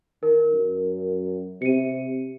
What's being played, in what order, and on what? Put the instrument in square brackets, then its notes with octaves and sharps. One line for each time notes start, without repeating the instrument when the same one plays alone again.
[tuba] D#3 [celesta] A#4
[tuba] F#2
[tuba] C3 [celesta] C#7 D#7